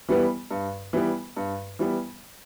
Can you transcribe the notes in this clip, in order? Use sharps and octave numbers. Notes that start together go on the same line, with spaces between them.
E3 G3 B3
G2
E3 G3 B3
G2
E3 G3 B3